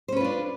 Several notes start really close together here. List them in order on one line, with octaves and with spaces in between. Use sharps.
C5 C#4 B4 F4 D4